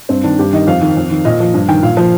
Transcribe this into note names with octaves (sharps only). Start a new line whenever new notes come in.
G2 C4
D#3 D4
G2 G4
D#3 D#5
F2 F5
D#3
F2
D#3
A#2 D#5
F3
G2
D#3 G5
A#2 F5
F3